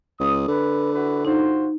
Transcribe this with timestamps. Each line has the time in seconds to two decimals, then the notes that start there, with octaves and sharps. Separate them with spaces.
0.20 C#2 D#6
0.48 D3 B4
0.94 E4 F#4 B4
1.25 D#4 F4 F#4 C5